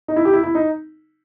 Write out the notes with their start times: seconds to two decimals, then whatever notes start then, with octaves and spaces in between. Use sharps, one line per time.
0.08 D#4
0.16 E4
0.25 G4
0.33 E4
0.43 E4
0.55 D#4